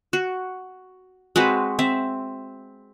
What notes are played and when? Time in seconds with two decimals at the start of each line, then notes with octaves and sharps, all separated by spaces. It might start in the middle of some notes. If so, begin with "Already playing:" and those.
0.13 F#4
1.36 G#3 C4 F#4 B4
1.79 C4 E5